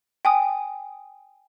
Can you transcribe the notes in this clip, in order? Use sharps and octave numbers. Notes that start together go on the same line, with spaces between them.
G5 G#5 D#6